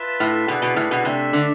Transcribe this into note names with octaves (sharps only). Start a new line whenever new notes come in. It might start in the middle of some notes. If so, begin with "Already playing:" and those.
Already playing: F4 B4 E5 A5
A2
B2 E4 G#4 B4 D5 G#5
B2
A2
B2
C3 A3 D4 A4 E5
D3